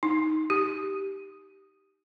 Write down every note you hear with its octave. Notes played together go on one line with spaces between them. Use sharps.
D#4
G4